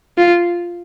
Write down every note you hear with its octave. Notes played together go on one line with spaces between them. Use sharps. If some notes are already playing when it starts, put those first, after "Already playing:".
F4